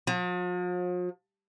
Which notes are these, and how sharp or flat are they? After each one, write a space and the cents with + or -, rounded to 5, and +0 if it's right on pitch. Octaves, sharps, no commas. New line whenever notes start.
F3 +45